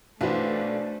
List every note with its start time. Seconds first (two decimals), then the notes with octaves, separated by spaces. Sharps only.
0.21 B1 E3 A3 D4 F#4 B4 C5